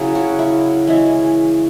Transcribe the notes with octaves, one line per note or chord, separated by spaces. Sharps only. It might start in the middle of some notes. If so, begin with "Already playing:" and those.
Already playing: C#3 F#3 C#4 E4
F#4
E4
E3 G#3 C#4 E4